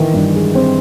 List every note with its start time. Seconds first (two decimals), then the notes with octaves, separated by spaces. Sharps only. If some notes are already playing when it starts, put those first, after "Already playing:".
Already playing: D#3 E3
0.14 G2
0.34 G#3
0.55 C4